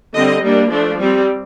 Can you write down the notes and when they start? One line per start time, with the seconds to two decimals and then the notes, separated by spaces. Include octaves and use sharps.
0.14 D3 G3 C4 D#5
0.43 G3 A#3 D4
0.70 F3 A3 D4
0.99 G3 C4